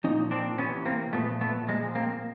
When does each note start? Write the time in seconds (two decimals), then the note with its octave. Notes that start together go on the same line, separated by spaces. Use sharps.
0.04 A#2 F3 C#4 D#4
0.31 C4 D4
0.58 C3 E3 B3 C#4
0.86 A#3 C4
1.13 A#2 F3 A3 B3
1.41 A3 B3
1.68 A#2 F3 G#3
1.95 A#3 C4